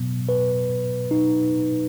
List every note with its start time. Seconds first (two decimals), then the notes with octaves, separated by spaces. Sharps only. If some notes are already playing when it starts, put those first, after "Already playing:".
Already playing: B2 F#3 B3
0.29 B4
1.11 D#4